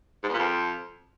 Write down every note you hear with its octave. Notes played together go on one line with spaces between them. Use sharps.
G#2
E2
A#2
F2